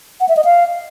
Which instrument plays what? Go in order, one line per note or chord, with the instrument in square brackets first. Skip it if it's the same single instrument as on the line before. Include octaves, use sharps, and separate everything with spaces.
[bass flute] F#5
E5
D#5
F5